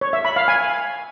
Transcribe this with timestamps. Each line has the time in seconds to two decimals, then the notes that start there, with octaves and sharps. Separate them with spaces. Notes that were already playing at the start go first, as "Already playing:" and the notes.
0.01 C#5
0.13 E5
0.25 B5
0.36 F5
0.48 G#5